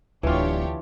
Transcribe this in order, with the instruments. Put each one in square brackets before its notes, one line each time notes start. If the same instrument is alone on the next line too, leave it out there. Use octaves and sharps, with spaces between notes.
[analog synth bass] D1 [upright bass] D2 [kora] E3 F4 [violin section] D4 G4 C#5